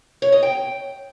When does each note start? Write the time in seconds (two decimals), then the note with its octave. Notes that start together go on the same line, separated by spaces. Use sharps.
0.22 C#5
0.32 D#5
0.43 G5